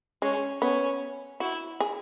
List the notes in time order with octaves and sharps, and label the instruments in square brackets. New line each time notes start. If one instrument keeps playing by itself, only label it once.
[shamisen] G#3 [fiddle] C#4
[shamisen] B3 [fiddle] C#4
[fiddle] E4 [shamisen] F#4
[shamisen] G#4